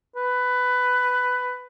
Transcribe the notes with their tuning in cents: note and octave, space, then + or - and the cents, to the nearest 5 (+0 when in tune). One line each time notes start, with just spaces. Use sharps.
B4 +15